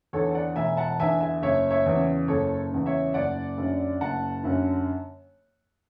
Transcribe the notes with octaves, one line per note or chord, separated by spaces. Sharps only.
E2 D3 A4 C#5
D5 F#5
E1 E5 G#5
F#5 A5
E2 D3 E5 G#5
E5 G#5
F#1 C#5 E5
C#5 E5
E2 C#3
F#1 A4 C#5
E2 C#3
C#5 E5
F#1 D5 F#5
F#2 D3
F#1 F#5 A5
F#2 D3